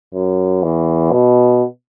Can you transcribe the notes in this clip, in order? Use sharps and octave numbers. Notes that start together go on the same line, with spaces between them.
F#2
E2
B2